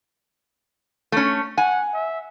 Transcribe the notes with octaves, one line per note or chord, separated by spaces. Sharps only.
A3 C#4
F#5 G#5
E5